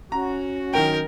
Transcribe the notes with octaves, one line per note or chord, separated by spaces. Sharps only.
C#4 F#4 A#5
D#3 F#3 A#4 G5